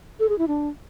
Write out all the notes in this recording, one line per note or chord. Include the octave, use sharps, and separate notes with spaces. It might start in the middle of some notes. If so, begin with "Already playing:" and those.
A4
G#4
E4
D4